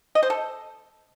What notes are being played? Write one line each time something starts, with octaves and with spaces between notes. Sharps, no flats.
D#5
C5
A4